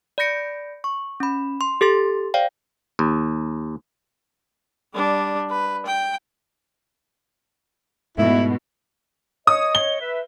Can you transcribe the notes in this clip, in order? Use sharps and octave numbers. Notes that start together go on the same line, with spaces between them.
D5 B5 G6 A#6 C#7 D7
C#6
C#4 B5
C6
G4 A4 C6 A6
C5 D5 F5 G5
D#2
G3 D4
B4
G5
G#2 B2 A3 E4
C#5 D#5 D#6
G7
B4 E5